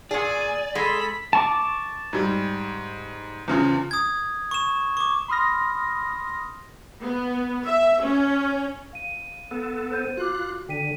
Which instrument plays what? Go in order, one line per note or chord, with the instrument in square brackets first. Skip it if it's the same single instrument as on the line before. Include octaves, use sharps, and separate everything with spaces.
[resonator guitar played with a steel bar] A#2 G#4 [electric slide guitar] D5 [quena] G#5
[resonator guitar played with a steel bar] G#3 [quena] A4 [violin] B5
[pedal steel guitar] A5 C#6 D6
[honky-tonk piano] G#2 G3
E2 C#3 F3
[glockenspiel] D#6 G#6
C#6 E7
C#6 D6
[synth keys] B5 C6 D#6 F6 A#6
[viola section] B3
E5
C#4
[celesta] F5 D#7
[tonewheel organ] B3 A4
[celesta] C5 G6 D#7
[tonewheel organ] F4 F#6 [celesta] F#4 D6
[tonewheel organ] D3 [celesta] G5 B6 D#7